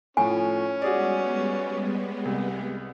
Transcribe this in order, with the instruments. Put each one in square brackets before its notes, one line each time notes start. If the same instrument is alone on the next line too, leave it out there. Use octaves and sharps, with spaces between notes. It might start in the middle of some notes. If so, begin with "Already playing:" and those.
[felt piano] A2 F3 [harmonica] C#4 [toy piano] G#5
[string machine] G3 G#3 B3 [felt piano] F#4 G#4 D5
[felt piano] C2